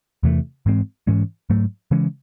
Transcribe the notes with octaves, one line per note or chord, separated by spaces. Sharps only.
E2 C3 E3 A3
G#2 E3 G#3 C4
G#2 E3 G#3 C#4
G#2 F#3 A3
C#3 E3 G#3 C#4